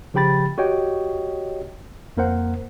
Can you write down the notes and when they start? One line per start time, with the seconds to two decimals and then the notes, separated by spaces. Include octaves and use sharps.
0.14 C#3 F3 G4 G5 B5 A6
0.58 F#4 G4 C#5 D#5 G5
2.17 F2 A#3 A#4 C5 F#5